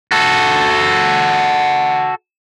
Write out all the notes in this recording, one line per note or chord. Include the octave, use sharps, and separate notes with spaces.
F#4 A4